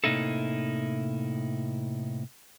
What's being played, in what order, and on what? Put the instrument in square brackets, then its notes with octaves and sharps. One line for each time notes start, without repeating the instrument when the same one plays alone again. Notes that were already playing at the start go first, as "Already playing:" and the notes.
[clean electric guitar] A2 C3 A#3 D#4 E4 A4